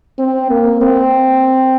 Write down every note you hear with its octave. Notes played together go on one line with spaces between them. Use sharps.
C4
A#3
C4